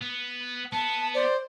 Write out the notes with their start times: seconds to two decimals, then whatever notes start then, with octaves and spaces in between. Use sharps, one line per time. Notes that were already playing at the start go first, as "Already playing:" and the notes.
0.02 B3
0.73 B3 A5
1.14 C5 D5